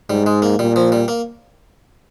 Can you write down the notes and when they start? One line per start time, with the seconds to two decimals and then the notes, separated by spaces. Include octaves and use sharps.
0.10 G#2 G3
0.26 G#3
0.42 A#3
0.59 A#2 G3
0.76 F3
0.92 G3
1.08 A#3